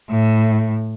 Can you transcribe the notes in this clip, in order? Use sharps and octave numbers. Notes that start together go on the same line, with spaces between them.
A2